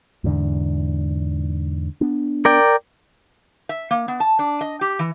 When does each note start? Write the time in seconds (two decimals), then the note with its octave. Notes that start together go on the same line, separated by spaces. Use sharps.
0.24 E2 G#2 D3
2.01 B3 D4
2.45 A#4 D5 G5
3.69 E5
3.91 A#3
4.08 B3
4.20 A5
4.39 D4
4.61 D#5
4.81 G4
4.99 E3